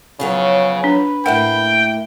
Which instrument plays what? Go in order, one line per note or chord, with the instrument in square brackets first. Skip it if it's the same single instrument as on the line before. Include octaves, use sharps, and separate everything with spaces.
[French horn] C#3 [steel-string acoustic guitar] F3 F#3 B3
[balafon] D4 [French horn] B4
[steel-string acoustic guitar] A2 A#3 E5 [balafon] A#4 F#5 [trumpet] G5